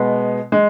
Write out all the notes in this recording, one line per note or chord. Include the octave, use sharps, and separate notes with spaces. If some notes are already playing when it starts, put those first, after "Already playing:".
Already playing: B2 G#3 B3
G#3